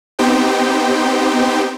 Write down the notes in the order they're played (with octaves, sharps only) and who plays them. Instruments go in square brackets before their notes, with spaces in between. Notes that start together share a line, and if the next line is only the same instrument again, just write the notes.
[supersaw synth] B3 C4 D#4 G4 C5 G5